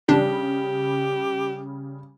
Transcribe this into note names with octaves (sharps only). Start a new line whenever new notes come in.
C#3 G3 D4 G4